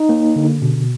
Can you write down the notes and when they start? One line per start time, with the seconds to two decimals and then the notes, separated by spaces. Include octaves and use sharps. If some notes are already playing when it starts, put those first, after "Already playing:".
Already playing: D#4
0.09 A#3
0.36 D3
0.62 B2